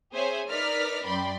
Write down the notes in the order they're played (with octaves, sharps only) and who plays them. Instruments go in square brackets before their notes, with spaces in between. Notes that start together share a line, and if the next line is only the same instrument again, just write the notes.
[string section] C4 G#4 C5 C#5 E5 G#5
D#4 A#4 B4 D5 F6 B6
F#2 D5 G5 B5 C6